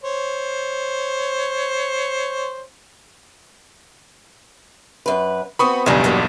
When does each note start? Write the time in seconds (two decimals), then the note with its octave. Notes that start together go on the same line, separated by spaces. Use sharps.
0.04 C5 C#5
5.06 F#2 B4
5.59 B3 C4 F#4 B5 C#6 D#6
5.86 B1 E2 G2 C#3 G3
6.04 F#3 G3 A#3